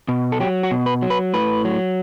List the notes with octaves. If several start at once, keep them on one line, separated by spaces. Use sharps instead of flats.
B2
A4
F#3 G4
F#4
B2
B4
F#3
B4
A2 B4
F#3